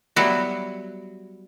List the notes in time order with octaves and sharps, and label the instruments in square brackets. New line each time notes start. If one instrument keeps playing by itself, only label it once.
[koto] F#3 G3 B3 E4 F#4